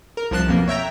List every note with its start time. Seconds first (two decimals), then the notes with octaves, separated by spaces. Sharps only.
0.17 A#4
0.31 C2 F3 A5 F#6 C7
0.48 F2 B2 A#3
0.67 C#5 E5 G5 A#5